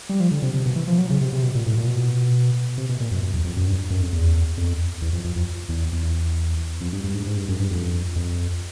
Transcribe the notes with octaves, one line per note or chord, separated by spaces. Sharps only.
G3
F3
D3
C3
C3
B2
E3
F3
F#3
C#3
C3
C3
B2
A#2
A2
A#2
B2
C3
B2
A#2
F#2
F#2
E2
F2
F#2
G2
F#2
F2
E2
F2
E2
F2
F2
F2
E2
E2
F2
G2
G2
G#2
G#2
G2
F#2
G2
F2
F2